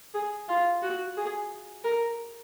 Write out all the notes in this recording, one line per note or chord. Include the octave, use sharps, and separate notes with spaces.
G#4
F4
F#4
G#4
A#4